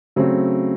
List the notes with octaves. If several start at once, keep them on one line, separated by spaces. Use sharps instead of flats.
C#3 F#3 A3 C4